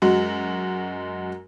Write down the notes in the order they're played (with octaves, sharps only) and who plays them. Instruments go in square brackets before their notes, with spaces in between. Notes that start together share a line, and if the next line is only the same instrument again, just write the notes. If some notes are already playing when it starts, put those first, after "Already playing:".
[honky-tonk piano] F#2 G#3 F#4